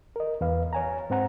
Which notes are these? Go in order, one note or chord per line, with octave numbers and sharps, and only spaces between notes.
A#4 D#5
E2 B4 F5
C#5 G#5 A#5
G#2 C4 C5 F#5 A#5